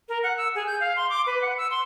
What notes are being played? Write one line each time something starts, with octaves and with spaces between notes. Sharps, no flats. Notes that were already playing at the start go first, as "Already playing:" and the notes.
A#4
F#5
E6
G#4
G6
F5
C6
D6
B4
F#5
E6
C6